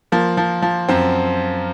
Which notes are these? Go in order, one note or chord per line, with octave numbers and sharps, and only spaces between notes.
F3 A#3
F3
F3
F#2 C4